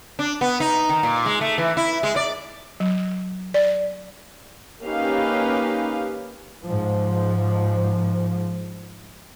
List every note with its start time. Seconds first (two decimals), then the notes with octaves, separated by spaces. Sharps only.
0.19 D4
0.41 B3
0.60 D#4
0.89 D#3
1.03 A#2
1.26 G#3
1.41 A3
1.58 E3
1.77 E4
2.03 G#3
2.16 D5
2.80 F#3
3.54 D5
4.82 A#3 C#4 D#4 G4 B4 F5
6.64 G#2 F3